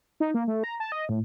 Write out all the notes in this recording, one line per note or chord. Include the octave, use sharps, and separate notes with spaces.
D#4
A#3
A3
A#5
A5
D#5
A2